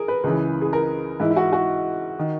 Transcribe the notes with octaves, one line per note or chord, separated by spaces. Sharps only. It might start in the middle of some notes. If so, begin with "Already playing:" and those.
Already playing: G#4 A#4
B4
C#2 C#3 E3
G#4
A#4
G#2 E3 E4
E4
F#4
F#4
D#3